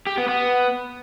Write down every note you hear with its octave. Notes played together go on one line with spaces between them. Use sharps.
G4
B3
B3